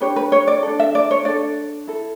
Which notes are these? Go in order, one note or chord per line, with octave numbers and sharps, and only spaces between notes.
D4 G4 B4 C#5
B4
C#5
D5
D4 A4
E5
D5
C#5
D4 A4 D5
E4 A4